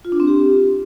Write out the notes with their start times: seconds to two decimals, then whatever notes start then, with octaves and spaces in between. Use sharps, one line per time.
0.05 F4
0.12 D4
0.20 C4
0.27 G4